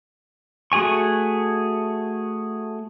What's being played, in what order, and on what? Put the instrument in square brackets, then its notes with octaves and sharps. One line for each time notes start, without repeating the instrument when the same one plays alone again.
[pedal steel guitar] A3 F#4 G#4 G#5 C#6